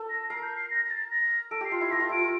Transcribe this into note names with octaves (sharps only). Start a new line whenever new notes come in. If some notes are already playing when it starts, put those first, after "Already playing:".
Already playing: A4
A#6
A#4 C7
G6
C7
A#6
A#6
A6
A#6
A4 D7
G4 C7
F4
E4 C7
G4 A#6
F4
E4 D7
F4